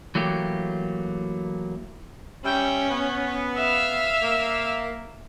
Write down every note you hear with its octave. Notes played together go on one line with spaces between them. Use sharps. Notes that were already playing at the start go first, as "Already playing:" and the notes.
E3 F#3 A3 A#3 G4
G3 C#4 E5 G5
B3
E5 F5 E6
A#3